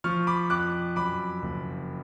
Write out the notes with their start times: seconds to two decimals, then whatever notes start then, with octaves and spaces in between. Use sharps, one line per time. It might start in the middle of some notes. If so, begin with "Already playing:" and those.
0.04 F3 C#6 F6
0.27 B5 D6
0.50 F2 D6 F#6
0.96 F#2 B5 D6
1.42 F#1